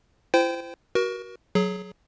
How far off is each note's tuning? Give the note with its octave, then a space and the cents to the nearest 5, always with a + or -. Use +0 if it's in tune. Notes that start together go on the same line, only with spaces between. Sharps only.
E4 +45 C5 -20 G5 +0
F#4 +15 A#4 +35
F#3 +0 G#4 +25